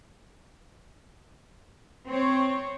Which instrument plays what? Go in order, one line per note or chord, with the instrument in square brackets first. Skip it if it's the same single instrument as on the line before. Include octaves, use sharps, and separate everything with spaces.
[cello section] C4 C#5